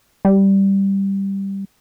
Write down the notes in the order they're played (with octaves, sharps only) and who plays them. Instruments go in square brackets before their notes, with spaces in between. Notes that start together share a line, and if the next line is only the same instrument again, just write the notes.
[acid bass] G3